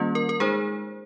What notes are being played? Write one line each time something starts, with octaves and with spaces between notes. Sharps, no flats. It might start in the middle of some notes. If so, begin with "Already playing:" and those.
Already playing: D#3 G3 A#3 C#4 F4
A#4
A#4
G#3 D#4 G#4 C5